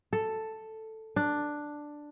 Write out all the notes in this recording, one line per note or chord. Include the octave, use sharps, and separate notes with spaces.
A4
D4